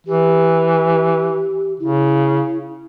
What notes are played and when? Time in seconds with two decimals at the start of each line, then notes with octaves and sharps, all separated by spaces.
0.07 E3 G4
1.80 C#3 E4